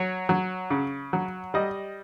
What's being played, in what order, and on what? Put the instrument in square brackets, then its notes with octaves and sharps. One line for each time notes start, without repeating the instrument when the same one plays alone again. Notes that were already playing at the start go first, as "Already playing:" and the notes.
Already playing: [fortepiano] F#3 C#5
F#3
C#3
F#3
G3 D#5